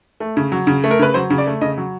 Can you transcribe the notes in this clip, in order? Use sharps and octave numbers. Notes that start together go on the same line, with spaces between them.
A3
C#3
F#3
C#3
A3
A#4
C#3 B4
F#3 C5
C#3
D5
A3
C#3 D#5
F#3